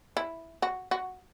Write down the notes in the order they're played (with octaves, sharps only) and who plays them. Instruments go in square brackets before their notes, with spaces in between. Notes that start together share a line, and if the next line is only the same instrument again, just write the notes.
[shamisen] E4
F#4
F#4